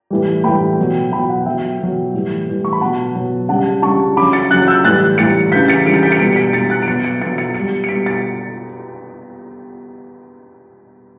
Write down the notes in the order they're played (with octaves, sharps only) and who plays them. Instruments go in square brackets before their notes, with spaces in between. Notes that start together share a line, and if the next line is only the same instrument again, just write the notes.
[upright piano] A2 E3 G3
A2 E3 G3 G5 B5
B2 F#3
B2 F#3 G5 B5
F#5
B2 F#3 E5 G5
B2 F#3
A2 E3 G3
A2 E3 G3
C#6
B5
B2 F#3 F#5 A5
B2 F#3
C#3 G3 F#5 A5
C#3 G3 A5 C#6
C#3 F#3 B5 D6
A6 C#7
C#3 F#3 F#6 A6
E6 G6
A2 E3 G3 F#6 A6
A2 E3 G3 A6 C#7
C#3 E3 G3 G6 B6
A6 C#7
C#3 E3 G3 B6 D7
A6 C#7
G6 B6
A6 C#7
B2 G3 B6 D7
B6 D7
B2 G3 A6 C#7
F#6 A6
D7
B2 F#3 A6 C#7
A6 C#7
B2 F#3 A6 C#7
A6 C#7
B2 G3 A6 C#7
C#7
B2 G3 B6 D7
A6 C#7